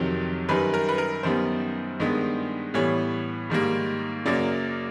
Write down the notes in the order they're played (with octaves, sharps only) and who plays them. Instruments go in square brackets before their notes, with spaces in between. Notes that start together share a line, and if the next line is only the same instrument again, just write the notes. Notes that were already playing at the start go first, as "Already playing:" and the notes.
Already playing: [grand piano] F2 C3 D#3 F#3
F#2 D#3 G3 B4
A#4
B4
A#4
F#2 D#3 G3 B3 C5
G2 D#3 G#3 B3
A2 E3 G3 B3 C#5
G#2 D#3 G3 A#3
F#2 C#3 F#3 A#3 D5